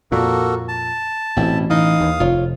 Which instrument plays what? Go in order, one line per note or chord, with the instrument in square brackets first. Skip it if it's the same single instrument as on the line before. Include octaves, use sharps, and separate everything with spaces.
[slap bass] F2 A#2 [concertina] A#3 F#4 A4
[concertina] A5
[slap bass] A1 [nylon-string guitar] B2 C4 E4
[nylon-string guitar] E3 D#4 [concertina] F5 D#6
[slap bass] D#2
[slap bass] F1 [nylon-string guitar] F4 C#5